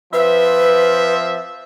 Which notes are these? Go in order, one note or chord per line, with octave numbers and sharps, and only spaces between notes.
F3 C4 B4 E5